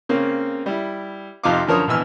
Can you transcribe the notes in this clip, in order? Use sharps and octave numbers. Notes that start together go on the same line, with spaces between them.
C#3 A#3 C4 C#4
G3 E4
F2 C3 D#4 F4 F5 D6
F#2 D3 F3 A#4 C#5 D#6
A#1 B2 E3 G#5 E6 F6